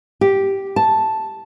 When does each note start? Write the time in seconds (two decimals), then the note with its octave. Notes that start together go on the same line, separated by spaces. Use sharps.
0.21 G4
0.76 A5